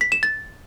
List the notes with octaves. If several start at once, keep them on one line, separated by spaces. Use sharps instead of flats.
B6
E7
A6